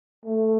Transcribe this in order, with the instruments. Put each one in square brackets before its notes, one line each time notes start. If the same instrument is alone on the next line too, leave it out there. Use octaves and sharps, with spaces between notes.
[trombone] A3